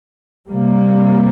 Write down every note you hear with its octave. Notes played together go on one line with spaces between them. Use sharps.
C3 G3 A#3